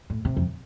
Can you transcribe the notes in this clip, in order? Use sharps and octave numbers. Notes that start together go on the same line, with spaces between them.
A2
C3
F2